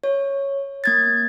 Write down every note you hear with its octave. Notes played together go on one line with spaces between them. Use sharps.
C#5
A#3 G#6 A6